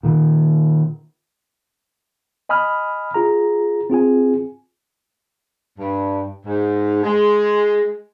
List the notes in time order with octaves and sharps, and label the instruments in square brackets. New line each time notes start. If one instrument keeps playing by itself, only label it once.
[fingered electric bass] A#2 D#3
[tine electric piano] D#5 G#5 B5 D#6 F6
F4 G#4 A#5
C4 F4 G#4 G#5
[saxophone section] G2
G#2
G#3